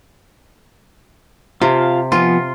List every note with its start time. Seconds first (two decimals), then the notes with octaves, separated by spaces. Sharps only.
1.62 C3 F4 F5 A5
2.12 F3 B3 F4 G#5